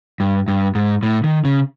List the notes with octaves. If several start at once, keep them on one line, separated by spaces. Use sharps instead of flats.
G2
G2
G#2
A2
D#3
C#3